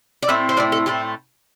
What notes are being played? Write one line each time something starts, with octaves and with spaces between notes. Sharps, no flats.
D5
A2 A3 C4 E4 E5
C5
A2 A3 C4 E4 D5
A4
A2 A3 C4 E4 G4